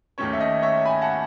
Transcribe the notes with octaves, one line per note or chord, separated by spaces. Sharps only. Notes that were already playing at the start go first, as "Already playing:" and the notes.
D#2 D#3 A3 C#4 C#5
E5
D#5
C#5 E5
G#5 B5
F#5 A5